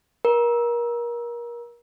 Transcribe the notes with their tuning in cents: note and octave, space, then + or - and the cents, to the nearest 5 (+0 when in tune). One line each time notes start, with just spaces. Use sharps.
A#4 +30